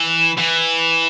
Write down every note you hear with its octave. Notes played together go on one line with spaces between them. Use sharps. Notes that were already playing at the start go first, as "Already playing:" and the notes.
Already playing: E3
E3